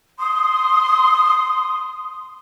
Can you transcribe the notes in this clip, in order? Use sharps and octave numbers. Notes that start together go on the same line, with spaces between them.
C6 D#6